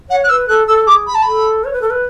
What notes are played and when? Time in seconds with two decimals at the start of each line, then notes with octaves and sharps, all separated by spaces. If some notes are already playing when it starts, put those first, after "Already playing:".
0.09 C#5 F#5
0.24 F#6
0.29 B4 E6
0.48 A4 F#6
0.67 A4 E6
0.87 G#4 D6
1.07 B5
1.15 A5
1.22 A4 B5
1.64 C#5
1.73 B4
1.82 A4
1.90 B4